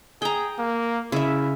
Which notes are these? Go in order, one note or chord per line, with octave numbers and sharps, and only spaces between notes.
G#4 G5 A#5
A#3
C#3 E4 E5